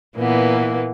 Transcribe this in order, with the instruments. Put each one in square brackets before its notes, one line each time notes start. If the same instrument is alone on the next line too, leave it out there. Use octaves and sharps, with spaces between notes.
[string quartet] A#2 E3 A#3 B3